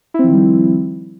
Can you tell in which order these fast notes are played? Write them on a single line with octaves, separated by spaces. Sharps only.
E4 C4 F3 D#3 G3